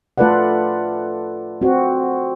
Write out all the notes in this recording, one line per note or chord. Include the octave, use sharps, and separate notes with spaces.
A3 F4 A4 B4 D5 F#5
C4 F#4